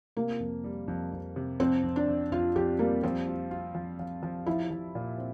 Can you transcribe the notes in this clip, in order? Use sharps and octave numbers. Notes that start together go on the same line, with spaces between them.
C3 A#3
F2
G3
F2
F2
C3
F2 C4
F2
D4
F2
F2 F4
F2 G4
G3 A#3
F3 C4
F4
F4
F3
F3
F3
F3 E4
F3
A#2
C4